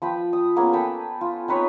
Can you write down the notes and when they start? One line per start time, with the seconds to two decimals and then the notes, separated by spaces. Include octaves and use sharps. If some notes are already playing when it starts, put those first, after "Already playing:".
0.02 F3 B4 G5
0.33 D#6
0.56 A#3 B3 C#4 G#4
0.73 A4 B4 G5
1.21 F4
1.48 C4 D#4 B4 C#5